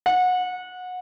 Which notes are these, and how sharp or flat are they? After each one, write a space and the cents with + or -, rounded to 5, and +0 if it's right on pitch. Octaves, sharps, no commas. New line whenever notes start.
F#5 -25